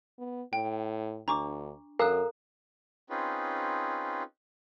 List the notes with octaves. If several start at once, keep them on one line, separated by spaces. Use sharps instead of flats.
B3
A2 G5
D2 D4 A#5 C#6 D6
F#2 A4 A#4 F5 A#5 D#6 F#6
C4 C#4 D#4 F4 G#4 B4